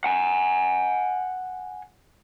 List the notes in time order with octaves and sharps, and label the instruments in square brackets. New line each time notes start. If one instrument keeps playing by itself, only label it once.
[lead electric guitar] F#5 G#5